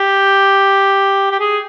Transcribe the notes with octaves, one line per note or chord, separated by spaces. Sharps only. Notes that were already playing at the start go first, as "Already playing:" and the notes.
Already playing: G4
G4
G#4